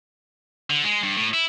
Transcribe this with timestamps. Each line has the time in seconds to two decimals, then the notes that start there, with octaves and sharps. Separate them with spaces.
0.70 D3
0.84 G#3
1.03 G2
1.17 A2
1.34 E4